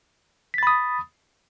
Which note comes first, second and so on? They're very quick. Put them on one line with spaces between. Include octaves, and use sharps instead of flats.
B6 A6 B5 D#6